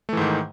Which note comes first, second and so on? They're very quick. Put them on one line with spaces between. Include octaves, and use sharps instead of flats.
A3 E3 G#2 D#3